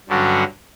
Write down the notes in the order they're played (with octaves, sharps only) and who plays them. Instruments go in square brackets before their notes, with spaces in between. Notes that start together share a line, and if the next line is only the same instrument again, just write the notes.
[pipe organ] G2 D3 F#3 C#4 F#4